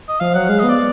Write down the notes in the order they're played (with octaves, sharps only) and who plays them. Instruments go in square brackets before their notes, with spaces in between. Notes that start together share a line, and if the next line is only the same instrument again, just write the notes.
[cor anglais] D#5
[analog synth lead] F3 [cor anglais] F5
[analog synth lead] F#3 [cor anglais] F#5
[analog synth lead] G#3 [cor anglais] F5
[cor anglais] D#5
[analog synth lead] B3
[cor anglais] D5